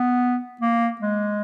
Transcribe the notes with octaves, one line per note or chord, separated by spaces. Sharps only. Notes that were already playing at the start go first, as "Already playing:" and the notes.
Already playing: B3
A#3
G#3